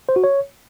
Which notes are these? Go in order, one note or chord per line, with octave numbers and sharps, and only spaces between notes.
C5
F#4
C#5